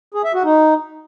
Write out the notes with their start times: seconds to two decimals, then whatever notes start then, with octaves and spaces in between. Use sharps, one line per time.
0.14 G#4
0.24 E5
0.34 F#4
0.44 D#4